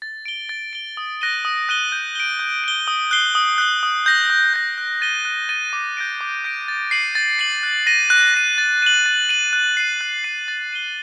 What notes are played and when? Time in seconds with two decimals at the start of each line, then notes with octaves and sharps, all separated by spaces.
0.02 A6
0.25 D7 G7
0.49 A6
0.73 D7 G7
0.97 D#6
1.21 F#6 A#6 D#7 G7
1.45 D#6
1.69 F#6 A#6 D#7 G7
1.92 G6
2.15 D7 G7
2.40 G6
2.64 D7 G7
2.88 D#6
3.11 F#6 C7 G7
3.35 D#6
3.58 F#6 C7 G7
3.83 D#6
4.06 G6 A#6
4.30 D#6
4.54 G6 A#6
4.78 F#6
5.01 A6 D#7 G7
5.25 F#6
5.49 A6 D#7 G7
5.73 D6
5.97 G6 A#6 D7
6.21 D6
6.44 G6 A#6 D7
6.68 A6
6.91 C7 D#7 F#7
7.15 A6
7.39 C7 D#7 F#7
7.63 F#6
7.87 A#6 D#7
8.10 F#6
8.34 A#6 D#7
8.58 A6
8.82 D#7 F#7
9.06 A6
9.29 D#7 F#7
9.53 F#6
9.77 C7 D#7
10.01 F#6
10.24 C7 D#7
10.48 A6
10.73 D#7 G7